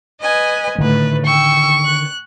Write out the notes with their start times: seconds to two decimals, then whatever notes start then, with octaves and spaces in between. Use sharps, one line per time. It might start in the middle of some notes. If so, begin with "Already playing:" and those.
0.22 B4 D#5 G#5
0.78 A2 D3 D#3 A3 B4
1.26 G5 C#6 E6
1.85 F#6